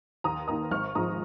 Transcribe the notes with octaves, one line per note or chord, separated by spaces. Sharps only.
D#2 A#5 D#6
D#3 A#3 A#5 D#6
G#1 C#6 F6
G#2 F3 G#3 F4 A#5 D#6